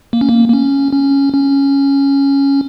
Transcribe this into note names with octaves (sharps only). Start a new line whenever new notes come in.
A#3
C#4
A#3
A#3
C#4
C#4
C#4